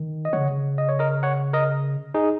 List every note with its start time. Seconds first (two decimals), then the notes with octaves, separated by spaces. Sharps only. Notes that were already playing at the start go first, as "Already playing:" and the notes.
Already playing: D#3
0.25 D#5
0.33 C#3 C#5 F#5
0.78 D#5
0.89 C#5
0.99 A#4 D#5
1.23 C#5 F#5
1.53 A#4 D#5
2.14 D#4 G#4